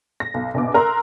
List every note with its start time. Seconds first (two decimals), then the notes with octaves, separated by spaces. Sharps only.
0.20 A#6
0.34 B1
0.54 A#1 B2 D6
0.74 A#4 A#5 C6 E6 F#6